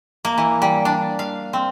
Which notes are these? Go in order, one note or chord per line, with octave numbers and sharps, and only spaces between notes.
A#3
E3
G3
D4
F5
C4